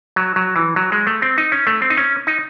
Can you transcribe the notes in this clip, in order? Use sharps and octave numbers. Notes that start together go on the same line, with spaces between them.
F#3
F#3
E3
F#3
G#3
A3
C4
D#4
C#4
A3
C4
D#4
C#4
D#4